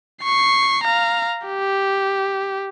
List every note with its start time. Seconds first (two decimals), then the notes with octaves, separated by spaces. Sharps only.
0.23 C#6 C7
0.83 F5 A#5
1.47 G4